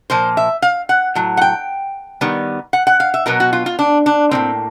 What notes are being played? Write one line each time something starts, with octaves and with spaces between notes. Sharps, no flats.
A#2 F3 A#3 C5
E5
F5
F#5
A2 F#3
F#5
G5
D#3 G3 B3
F#5
F#5
F5
E5
B2 F#3 B3 A#4
F#4
F4
F4
D4
D4
A2 F3 A#3 C4